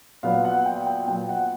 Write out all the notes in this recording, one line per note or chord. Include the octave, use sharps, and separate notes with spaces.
A#2 F#3 B3 F5
F#5
G5
G5
A#2 F#3 B3 G5
F#5